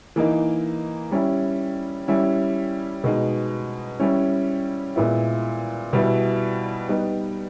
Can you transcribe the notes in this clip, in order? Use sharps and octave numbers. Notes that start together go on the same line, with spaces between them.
E3 A#3 D#4
G3 C#4 E4
G3 C#4 E4
B2 G#3 D#4
G3 C#4 E4
A#2 G#3 B3 E4
B2 G3 B3 E4
G3 B3 D#4